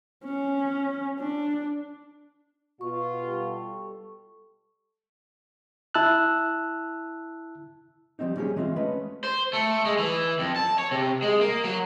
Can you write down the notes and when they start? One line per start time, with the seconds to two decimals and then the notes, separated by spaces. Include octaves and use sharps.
0.24 C#4
1.19 D4
2.81 B2 F4 C#6
3.21 G3 G4 A4
5.94 E4 A5 E6 F#6
8.19 F3 G3 C4 D#4
8.36 G3 A#3 C#4 G4 G#4
8.56 E3 G#3 C4 F4 E5
8.76 G#3 A3 C#4 B4 D#5
9.24 C5
9.53 A3
9.85 G#3
9.99 E3
10.39 F2
10.56 A5
10.78 C#5
10.91 C3
11.22 G#3
11.41 A#3
11.64 F#3